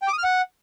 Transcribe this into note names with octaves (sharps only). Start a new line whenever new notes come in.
G5
D6
D#6
F6
F#5